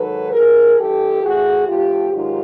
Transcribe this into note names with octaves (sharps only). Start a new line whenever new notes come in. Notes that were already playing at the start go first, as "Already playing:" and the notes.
Already playing: G#2 D#3 F#3 A4 B4
G2 E3 G#4 A#4
G2 E3 G4 A4
A2 E3 F#4 G#4
A2 F3 F4 G4
G#2 D#3 F#3 F4 G4